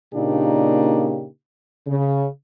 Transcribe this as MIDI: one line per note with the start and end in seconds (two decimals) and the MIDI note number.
0.15 1.26 46
0.15 1.26 49
0.15 1.26 58
0.15 1.26 62
0.15 1.26 63
0.15 1.26 67
1.87 2.26 49